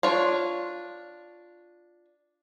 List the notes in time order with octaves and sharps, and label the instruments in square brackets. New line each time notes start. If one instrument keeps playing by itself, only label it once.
[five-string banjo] D4 F4 C#5